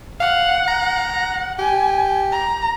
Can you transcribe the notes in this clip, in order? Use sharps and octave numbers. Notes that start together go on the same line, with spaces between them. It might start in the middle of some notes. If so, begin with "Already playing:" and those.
F5 F#5
A#5
F#5
G4 G#5
A#5